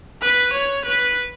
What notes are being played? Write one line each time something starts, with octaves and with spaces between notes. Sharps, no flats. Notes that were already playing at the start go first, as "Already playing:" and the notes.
B4
C#5
B4